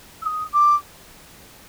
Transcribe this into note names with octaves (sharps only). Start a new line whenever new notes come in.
E6
D#6
D6